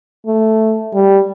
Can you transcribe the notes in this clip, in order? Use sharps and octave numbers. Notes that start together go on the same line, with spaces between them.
A3
G3